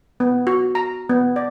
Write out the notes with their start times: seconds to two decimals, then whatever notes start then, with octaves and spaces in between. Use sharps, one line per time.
0.20 B3
0.47 F#4
0.75 A#5
1.09 B3
1.36 D5